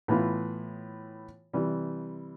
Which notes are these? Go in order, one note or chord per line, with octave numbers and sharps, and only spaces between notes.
A2 E3 B3 F4
C3 E3 G3